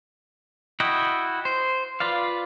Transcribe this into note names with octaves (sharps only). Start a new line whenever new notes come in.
E4 F#4 D#5 G5
C5
F4 B4 D5 F5